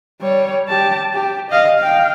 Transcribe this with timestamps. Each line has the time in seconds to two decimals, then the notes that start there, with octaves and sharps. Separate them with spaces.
0.21 G3 C#5
0.69 G4 A5
1.14 G4
1.51 D#5 F5
1.79 F5 G5